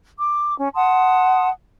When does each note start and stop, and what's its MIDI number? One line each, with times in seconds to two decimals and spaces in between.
0.19 0.57 86
0.59 0.69 61
0.75 1.48 78
0.75 1.48 81
0.75 1.48 84
0.75 1.48 87